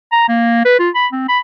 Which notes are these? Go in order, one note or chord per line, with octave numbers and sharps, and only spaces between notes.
A#5
A#3
B4
F4
B5
C4
B5